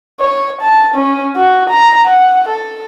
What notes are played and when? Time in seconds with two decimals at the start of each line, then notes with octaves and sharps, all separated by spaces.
0.20 C#5
0.61 A5
0.95 C#4
1.36 F#4
1.70 A#5
2.08 F#5
2.49 A4